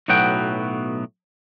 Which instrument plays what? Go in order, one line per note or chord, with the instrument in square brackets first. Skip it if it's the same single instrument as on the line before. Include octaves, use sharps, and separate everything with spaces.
[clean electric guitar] B1 A2 F#3 B3 F#5 G5